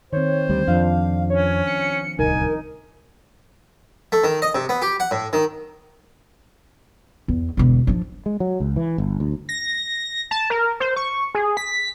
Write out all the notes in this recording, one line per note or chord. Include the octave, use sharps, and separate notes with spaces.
D#3 C4 C5 C#5
D2 G3
F2 F3 D4 F5
C#4 C#5
C#7
D1 C2 D#4 A#4 G#5
A3
D#3
D#5
C3
B3
G4
F#5
A2
D#3
E2
E1 D3
F3 D4
G#3
F#3
C#2
E3
G1
D2
A#6
A5
A#4
C5
C#6
G#4
B6